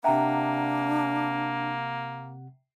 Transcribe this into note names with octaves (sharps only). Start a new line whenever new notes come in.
C3 A#3 D4 E5 F#5 G5 A#5